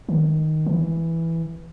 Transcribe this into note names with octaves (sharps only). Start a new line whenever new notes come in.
D#3
E3